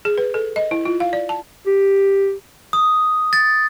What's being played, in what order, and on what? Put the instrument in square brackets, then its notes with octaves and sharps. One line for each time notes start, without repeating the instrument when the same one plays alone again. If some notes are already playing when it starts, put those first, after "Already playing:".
[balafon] G#4
B4
A4
D#5
E4
F4
F5
D5
A5
[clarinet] G4
[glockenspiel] D#6
A6